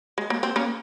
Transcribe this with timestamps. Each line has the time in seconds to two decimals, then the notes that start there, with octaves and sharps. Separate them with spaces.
0.18 G#3
0.30 A#3
0.43 C4
0.56 A#3 C#4